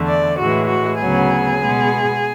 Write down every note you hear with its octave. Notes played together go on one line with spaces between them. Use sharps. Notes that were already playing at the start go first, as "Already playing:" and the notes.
Already playing: E2 D3 A3
D5
A2 E3 G#3 F#4
F#4
D2 C#3 F#3 B3 G#4
B2 G#3 B3